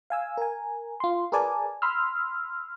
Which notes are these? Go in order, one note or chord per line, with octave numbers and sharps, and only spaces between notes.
F5 G#5 E6
A#4 G#5
F4 C6
G#4 A#4 B4 D5 G#5 A5
B5 C6 E6 F6